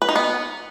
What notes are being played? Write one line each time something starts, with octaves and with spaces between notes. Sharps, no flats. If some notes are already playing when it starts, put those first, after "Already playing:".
B4
D#4
B3